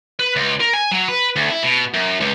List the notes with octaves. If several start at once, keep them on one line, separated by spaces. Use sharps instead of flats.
B4
C#2
A#4
G#5
F#3
B4
D2
E4
B2
F#2
C#2